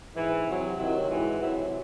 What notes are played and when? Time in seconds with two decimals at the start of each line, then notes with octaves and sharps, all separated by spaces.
0.14 G#2 E3
0.46 C3 F#3
0.77 C3 D#3 F#3 E4
1.10 G#2 E3
1.40 C3 F#3 E4